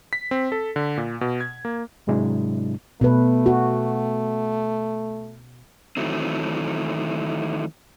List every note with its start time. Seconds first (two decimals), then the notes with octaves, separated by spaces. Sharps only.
0.13 B6
0.31 C4
0.52 A4
0.76 D3
0.98 A#2
1.21 B2
1.41 G#6
1.65 A#3
2.07 G#2 C3 F#3 G#3 D4 E4
3.01 B2 A3 B4
3.46 F#4
5.97 D#3 E3 F#3 A3 C4